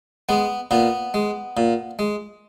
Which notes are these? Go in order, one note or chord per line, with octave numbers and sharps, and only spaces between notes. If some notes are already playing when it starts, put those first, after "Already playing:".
G#3 B3
A#2 B3
G#3
A#2
G#3